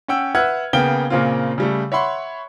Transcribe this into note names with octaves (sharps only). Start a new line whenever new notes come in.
C#4 F#5 G5 E6
B4 E5 F#5 E6 F6 G#6
C#3 A#3 B3 G5 G7
A#2 C#3 A#3 C4 F4
C#3 G3 A3
C#5 E5 F#5 B5 C6